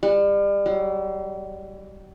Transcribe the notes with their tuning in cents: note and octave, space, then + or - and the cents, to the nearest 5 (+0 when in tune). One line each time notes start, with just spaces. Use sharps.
G3 +35
G3 -45